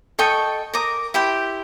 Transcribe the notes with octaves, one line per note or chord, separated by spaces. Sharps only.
A4 D#5 G5 C#6
A#4 A#5 D6 D#6
E4 G4 C5 G5